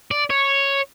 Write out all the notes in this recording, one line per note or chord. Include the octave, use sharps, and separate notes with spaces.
D5
C#5